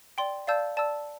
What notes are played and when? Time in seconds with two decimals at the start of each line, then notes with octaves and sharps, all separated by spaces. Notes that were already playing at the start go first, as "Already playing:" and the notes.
0.18 D5 G5 C6
0.47 D5 F5 A5 E6 G6
0.77 D5 A5 E6